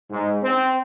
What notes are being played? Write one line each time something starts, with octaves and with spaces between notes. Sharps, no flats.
G#2
C4